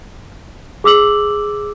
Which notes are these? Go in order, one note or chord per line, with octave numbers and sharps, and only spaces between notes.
G#4 D6 E6 F#7